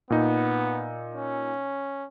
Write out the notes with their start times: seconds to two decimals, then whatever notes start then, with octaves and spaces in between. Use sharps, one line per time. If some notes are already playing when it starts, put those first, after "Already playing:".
0.10 A#2 B3 D#4
1.15 C#4